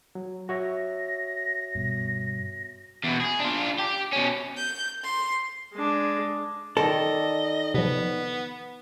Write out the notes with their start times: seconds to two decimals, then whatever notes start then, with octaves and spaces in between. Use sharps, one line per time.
0.15 F#3
0.49 F#4 C#5 E5 A#6
1.75 G2 B2
3.04 E2 B2
3.21 G#4
3.40 D4 F4
3.79 G4
4.13 B2 C#4
4.57 G6
5.04 C6
5.74 G#3 D4
6.77 D#3 A4 D5 D#5
7.74 C3 F3 B3